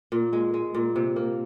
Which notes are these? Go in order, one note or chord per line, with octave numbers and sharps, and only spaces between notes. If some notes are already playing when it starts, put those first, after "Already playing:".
A#2
G#3
G#3
A#2
C3
A#3